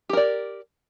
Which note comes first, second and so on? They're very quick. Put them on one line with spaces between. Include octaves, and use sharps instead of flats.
G4 A#4 D5